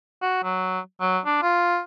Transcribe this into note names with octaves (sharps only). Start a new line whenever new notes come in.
F#4
F#3
F#3
D4
F4